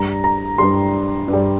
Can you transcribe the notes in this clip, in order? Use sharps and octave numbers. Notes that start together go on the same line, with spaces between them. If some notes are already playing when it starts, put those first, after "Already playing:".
Already playing: G2 G3 A#5
A#5
G2 G3 C6
G2
G3